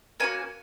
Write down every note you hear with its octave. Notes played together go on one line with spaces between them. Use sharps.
A#3 C#4 F#4 G#5